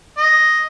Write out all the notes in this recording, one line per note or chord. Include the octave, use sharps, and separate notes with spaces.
D#5